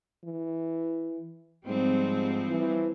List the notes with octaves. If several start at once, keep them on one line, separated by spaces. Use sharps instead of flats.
E3
G#2 F3 G3 C4
E3